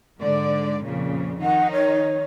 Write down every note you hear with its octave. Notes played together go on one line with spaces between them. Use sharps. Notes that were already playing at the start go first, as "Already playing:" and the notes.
G#2 D3 D5
F2 A#2 C#3
D#3 D#4 F#5
C#5